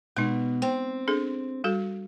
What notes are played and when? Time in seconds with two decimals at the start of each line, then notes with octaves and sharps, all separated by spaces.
0.16 B2 G#3 D#4
0.62 C4 G5
1.08 D4 G#4 A4
1.64 G3 F#4 A4